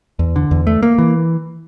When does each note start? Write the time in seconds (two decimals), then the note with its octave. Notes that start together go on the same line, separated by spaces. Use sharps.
0.19 E2
0.36 D3
0.51 E2
0.67 A3
0.83 A#3
0.98 E3